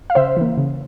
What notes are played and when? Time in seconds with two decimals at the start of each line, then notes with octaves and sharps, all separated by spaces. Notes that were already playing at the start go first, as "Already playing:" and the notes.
0.10 F5
0.15 C#3 C5 E5
0.37 E3 A#3
0.58 C#3